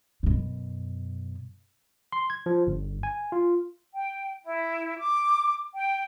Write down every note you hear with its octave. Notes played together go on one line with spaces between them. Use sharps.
F#2 B2
C6
G#6
F3
G1
G#5
F4
G5
E4
D6
G5